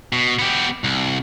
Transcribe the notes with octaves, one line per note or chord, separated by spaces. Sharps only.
B2
B3 G4
C2